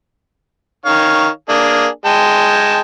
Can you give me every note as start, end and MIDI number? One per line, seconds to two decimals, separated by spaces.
0.86 1.28 51
0.86 1.28 73
0.86 1.28 77
1.49 1.87 58
1.49 1.87 62
1.49 1.87 68
2.05 2.81 56
2.05 2.81 79
2.05 2.81 81